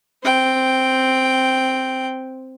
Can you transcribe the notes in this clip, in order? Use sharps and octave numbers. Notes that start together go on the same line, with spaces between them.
C4 G5